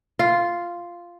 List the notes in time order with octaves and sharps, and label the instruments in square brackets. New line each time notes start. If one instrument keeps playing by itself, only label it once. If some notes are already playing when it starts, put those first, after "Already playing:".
[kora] F4